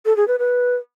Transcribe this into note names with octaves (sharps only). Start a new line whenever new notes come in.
A4
G#4
B4
B4